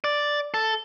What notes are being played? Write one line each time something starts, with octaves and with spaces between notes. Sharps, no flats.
D5
A4